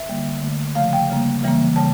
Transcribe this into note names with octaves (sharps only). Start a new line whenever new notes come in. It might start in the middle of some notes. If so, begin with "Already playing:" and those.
Already playing: E5
D3 G3 A#3
D3 A3
C#3 F3 A3 F5
G5
C#3 G3 A#3
C#3 E3 G3 A#3
C#3 G3 A5